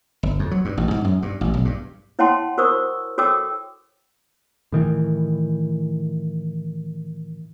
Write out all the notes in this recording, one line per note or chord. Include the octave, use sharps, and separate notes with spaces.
G1
F2
F#3
G2
A1
G#2
F#2
G2
A1
B1
G2
E4 C#5 F#5 G5 A5 C6
F#4 A#4 C5 C#6 D#6 E6
F#4 A4 C#5 G5 D6 E6
A2 D#3 E3